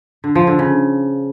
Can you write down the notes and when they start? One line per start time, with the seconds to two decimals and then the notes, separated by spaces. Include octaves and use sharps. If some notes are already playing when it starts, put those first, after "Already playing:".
0.24 D3
0.35 F3
0.47 D3
0.59 C#3